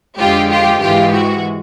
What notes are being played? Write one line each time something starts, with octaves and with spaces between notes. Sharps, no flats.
F2 D3 F3 G#3 F4 G4
F4 G4
G#2 E3 G#3 F4 G4
F#4